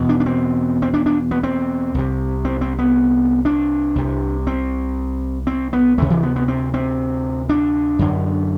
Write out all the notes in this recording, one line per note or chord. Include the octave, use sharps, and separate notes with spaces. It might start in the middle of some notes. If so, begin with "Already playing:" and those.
Already playing: E2 B2
D4
D4
C4
C4
D4
D4
B3
C4
C2 C3
C4
C4
B3
D4
C2 C3
C4
C4
B3
D2 C3 A3
E3
B3
B3
C4
C4
D4
F#2 D3